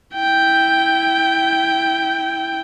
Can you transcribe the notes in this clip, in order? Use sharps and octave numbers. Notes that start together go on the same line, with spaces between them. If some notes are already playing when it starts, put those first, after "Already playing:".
E4 G5